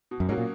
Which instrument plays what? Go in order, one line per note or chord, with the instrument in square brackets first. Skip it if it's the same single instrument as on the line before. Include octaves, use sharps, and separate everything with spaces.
[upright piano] B2
[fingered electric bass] F#2
[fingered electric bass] G#2 [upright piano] F#3 A#3 C#4
[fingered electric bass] A#2